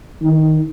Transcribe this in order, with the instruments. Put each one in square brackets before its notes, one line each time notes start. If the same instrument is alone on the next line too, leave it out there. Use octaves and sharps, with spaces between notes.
[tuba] D#3